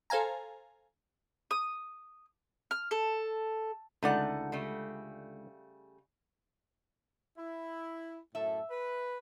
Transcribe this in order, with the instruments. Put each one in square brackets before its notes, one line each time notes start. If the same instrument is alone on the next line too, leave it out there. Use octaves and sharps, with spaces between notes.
[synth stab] A4 C5 F5 G#5 A#5
[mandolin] D#6
F6
A4
[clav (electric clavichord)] C#2 D3 D5 [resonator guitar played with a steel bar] A3 D#4 F#5
[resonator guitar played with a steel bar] C#3 G3 A3
[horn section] E4
[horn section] F#2 A2 A4 [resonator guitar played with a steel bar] E5
[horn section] B4